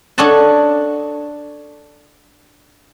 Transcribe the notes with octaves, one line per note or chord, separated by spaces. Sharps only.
D4 A4 C#5 D#5 F#5 A5